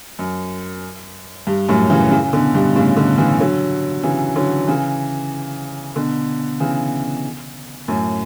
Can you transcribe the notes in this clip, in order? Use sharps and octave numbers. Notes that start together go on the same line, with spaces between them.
F#2
G2
F#2 A2
C#3 E3
C#3 E3
B2 D3
G2 B2
A2 C#3
B2 D3
C#3 E3
D3 F#3
C#3 E3
D3 F#3
C#3 E3
B2 D3
C#3 E3
F#2 A2